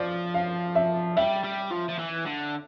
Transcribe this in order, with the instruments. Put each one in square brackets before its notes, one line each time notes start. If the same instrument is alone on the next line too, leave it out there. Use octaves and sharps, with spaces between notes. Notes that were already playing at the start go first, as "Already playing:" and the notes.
Already playing: [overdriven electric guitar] F3 [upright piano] D5
[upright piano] F5
E5
[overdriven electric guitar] G3 [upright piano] E5
[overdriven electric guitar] G3
F3
F3
E3
D3